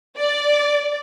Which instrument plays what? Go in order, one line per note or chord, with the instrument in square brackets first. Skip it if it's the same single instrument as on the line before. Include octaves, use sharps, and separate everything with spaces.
[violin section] D5